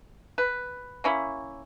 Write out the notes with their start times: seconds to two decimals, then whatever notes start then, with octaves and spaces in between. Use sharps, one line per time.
0.38 B4
1.04 A#3 C#4 E4